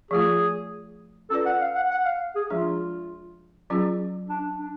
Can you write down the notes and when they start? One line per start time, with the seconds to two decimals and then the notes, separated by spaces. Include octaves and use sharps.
0.11 F3 A3 F4 G#4
1.30 C#4 F4 A4 B4 D5
1.46 F#5
1.61 F5
1.75 F#5
1.91 F#5
2.05 F5
2.36 G#4
2.50 F3 G#3 D4 F4 G#4
3.70 F#3 C#4 F4 G#4
4.29 D4
4.60 D4